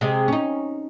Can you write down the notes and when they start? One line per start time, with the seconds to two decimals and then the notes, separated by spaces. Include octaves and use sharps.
0.01 C3 G#3
0.28 C#4 D#4